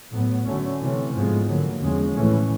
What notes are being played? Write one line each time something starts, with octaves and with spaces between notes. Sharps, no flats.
A2 F#3 B3
D3 F#3 A3 C#4
C3 E3 A3 C#4
G#2 F3 G#3 B3
D3 F#3 A#3
E2 C#3 F3 G#3
A2 E3 A3 C#4